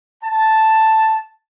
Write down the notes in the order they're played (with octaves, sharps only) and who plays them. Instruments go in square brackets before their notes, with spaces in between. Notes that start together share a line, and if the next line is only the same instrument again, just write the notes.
[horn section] A5